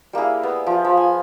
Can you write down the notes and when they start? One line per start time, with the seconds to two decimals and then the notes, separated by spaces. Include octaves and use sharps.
0.13 G3 A#3 E4 G#4
0.43 B3
0.66 F3
0.85 F3
0.97 G#5